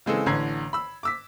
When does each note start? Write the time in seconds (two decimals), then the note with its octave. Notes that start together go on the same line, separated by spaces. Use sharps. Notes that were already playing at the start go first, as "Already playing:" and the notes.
0.06 C#3 E3 G#3 C4 G#4 A4
0.26 A1 D3 E3 A#5 G#6 C7
0.73 B5 E6
1.03 D6 E6 B6